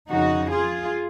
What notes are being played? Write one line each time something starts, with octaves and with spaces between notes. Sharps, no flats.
F2 C#3 D#4 F#4
F4 G#4